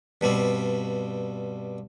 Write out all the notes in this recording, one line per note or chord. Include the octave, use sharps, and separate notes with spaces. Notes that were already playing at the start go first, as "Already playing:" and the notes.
G2 B2 G3 C4